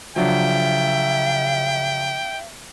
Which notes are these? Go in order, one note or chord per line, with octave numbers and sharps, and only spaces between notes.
C#3 F3 F#3 D4 E5 G5